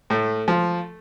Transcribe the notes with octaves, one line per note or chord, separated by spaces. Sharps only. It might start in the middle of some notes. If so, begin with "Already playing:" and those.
A2 A3
F3